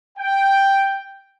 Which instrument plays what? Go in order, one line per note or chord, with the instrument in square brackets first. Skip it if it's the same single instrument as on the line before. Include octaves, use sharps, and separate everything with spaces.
[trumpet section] G5